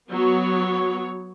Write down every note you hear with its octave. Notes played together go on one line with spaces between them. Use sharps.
F#3 B3 C#5